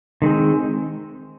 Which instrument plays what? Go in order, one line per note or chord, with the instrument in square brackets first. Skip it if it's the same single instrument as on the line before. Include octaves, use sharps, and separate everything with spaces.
[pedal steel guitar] D#3 G#3 C4